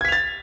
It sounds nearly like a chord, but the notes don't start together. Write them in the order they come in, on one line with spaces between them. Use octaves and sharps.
G#6 B6 F7 A6